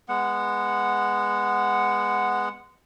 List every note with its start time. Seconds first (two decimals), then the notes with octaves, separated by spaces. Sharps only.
0.09 G#3 B3 F#5